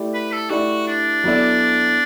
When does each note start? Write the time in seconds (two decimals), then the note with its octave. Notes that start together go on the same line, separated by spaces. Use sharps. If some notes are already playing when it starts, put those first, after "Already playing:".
Already playing: A3 E4 G4 D5
0.14 B4
0.32 A4
0.50 A3 E4 F#4 G4 D5
0.87 D4
1.24 F#3 B3 E4 A4 D5